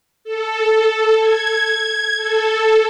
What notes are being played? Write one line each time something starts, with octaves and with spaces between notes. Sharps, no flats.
A4
G#6
A4